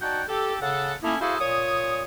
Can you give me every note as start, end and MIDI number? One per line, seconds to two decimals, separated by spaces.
0.01 0.23 63
0.01 0.23 66
0.01 0.23 74
0.01 0.23 78
0.01 0.23 79
0.01 0.23 81
0.29 0.56 67
0.29 0.56 69
0.61 0.93 49
0.61 0.93 69
0.61 0.93 78
1.03 1.16 57
1.03 1.16 58
1.03 1.16 61
1.03 1.16 63
1.03 1.16 64
1.21 1.36 64
1.21 1.36 66
1.21 1.36 68
1.21 1.36 69
1.21 1.36 72
1.21 1.36 77
1.40 2.05 46
1.40 2.05 73
1.40 2.05 87